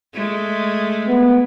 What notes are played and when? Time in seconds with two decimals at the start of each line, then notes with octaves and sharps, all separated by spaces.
0.13 G#3 A3
1.07 B3